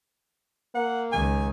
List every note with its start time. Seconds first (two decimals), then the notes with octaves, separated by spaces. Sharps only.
0.75 A#3 F#5
1.12 C#2 D#3 G#5